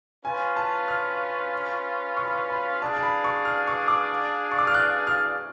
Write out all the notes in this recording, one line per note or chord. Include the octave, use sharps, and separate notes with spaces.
C#4 F4 B4 F5 G#5
A5
F6
C#6
B5
C#6
B5
D4 G#4 D5 F5 A5
A5
B5
C#6
F6
C#6
D6
C#6
D6
F6
F#6
F6